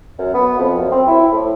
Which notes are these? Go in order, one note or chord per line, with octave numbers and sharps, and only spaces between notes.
F#2
B3
F2
F#2
C4
E4
A2